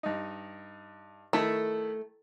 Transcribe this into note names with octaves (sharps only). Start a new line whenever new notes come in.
G2 D#4
D#3 A3 E4 A4